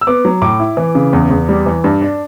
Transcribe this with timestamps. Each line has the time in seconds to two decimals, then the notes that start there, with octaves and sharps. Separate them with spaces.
0.01 E6
0.07 B3 D6
0.25 F#3
0.42 A2 D6
0.60 E4
0.77 E3
0.95 C#3
1.13 E2
1.30 E2
1.49 G3
1.66 E3
1.84 G2
2.02 D4